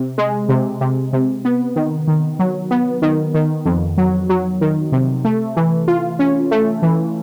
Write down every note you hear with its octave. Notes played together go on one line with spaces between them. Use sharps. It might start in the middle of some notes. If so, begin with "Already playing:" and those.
Already playing: C3
G#3
C3
C3
C3
B3
D#3
D#3
F#3
B3
D#3
D#3
F2
F#3
F#3
D#3
C3
A3
E3
F4
C#4
A3
E3